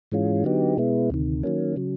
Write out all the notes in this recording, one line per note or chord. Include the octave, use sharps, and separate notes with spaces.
G#2 E3 G#3 C#4 F4
D3 F#3 B3 D#4 G4
B2 G#3 B3 E4
D2 C3 D#3
D#3 F#3 A#3 C#4
C#3 F#3